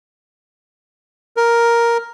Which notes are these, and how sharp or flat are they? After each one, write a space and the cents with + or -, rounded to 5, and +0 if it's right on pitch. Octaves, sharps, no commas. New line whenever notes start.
A#4 +5